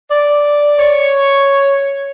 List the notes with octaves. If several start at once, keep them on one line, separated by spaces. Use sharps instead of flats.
D5
C#5